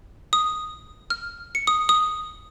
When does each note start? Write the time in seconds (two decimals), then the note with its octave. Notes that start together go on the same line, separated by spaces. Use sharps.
0.33 D#6
1.10 F6
1.55 C#7
1.67 D#6
1.89 D#6